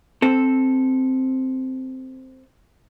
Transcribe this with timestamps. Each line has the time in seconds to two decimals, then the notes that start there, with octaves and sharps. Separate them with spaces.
0.22 C4 A4